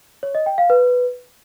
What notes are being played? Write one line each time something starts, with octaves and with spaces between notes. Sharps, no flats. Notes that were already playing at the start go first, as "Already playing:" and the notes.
C#5
D#5
G5
F5
B4